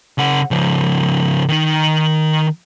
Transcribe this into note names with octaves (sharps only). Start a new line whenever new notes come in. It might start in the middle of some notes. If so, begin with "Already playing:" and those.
C#3 F#5
C#3 F3
D#3 D#4